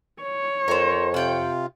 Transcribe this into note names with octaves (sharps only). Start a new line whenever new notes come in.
C#5
F2 A#4 C5
C3 F4 F#5 G5